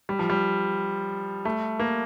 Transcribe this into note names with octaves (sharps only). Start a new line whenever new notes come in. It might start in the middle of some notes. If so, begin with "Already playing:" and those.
G3
F3
G3
A3
A#3